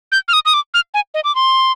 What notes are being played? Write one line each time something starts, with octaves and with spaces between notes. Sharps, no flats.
G6
F6
D#6
D#6
D6
F6
G#5
D#5
D6
C6